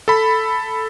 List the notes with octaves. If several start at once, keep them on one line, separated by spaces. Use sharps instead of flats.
A4 B5